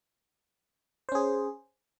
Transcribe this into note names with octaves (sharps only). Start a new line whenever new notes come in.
C#4 G#4 C5